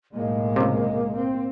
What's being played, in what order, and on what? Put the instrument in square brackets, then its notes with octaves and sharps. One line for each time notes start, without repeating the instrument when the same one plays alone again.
[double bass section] B1 A2 G#3 [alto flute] A#3
[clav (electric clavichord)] C#2 C3
[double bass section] C4